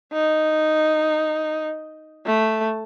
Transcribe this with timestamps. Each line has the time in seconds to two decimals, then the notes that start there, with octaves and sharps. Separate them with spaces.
0.13 D#4
2.27 A3